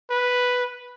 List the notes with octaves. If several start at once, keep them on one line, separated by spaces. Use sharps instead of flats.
B4